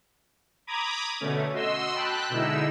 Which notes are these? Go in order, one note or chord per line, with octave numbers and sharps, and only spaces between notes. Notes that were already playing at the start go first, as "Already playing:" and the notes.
A#5 B5 D6 D#6 G#6
B2 D3 A3 C#4
F#4 D#5 C6 E6
G5 A5 B5 F#6
B2 D3 G#3 D#4 E4 E6